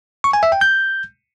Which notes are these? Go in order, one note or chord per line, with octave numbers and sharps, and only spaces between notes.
C#6
G#5
E5
G5
G6